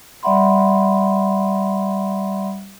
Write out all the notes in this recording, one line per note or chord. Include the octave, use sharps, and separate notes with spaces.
G3 D5 E5 F#5 B5 C6